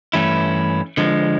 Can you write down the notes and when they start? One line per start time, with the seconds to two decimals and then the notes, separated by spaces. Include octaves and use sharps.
0.13 G2 E3 A3 C#4 E4
0.97 D3 F3 G#3